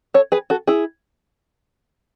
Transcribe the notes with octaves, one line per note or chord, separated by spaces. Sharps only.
A4 C#5
G#4 B4
F#4 A4
E4 G#4